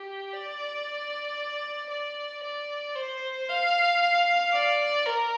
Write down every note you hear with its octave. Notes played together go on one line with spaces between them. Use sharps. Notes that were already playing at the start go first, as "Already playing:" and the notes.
Already playing: G4
D5
D5
D5
C5
F5
D5
A#4